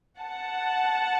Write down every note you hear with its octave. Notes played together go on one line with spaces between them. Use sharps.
F#5 A5